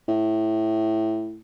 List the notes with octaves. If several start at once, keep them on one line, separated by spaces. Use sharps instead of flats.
A2